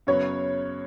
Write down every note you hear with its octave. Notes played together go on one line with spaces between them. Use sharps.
F#2 C#3 F#3 B3 C#5